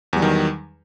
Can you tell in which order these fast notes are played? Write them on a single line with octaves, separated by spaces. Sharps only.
E2 G3 F#3 D#3